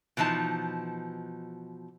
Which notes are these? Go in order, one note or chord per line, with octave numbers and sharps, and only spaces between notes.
B2 E3 F3 D#4 A5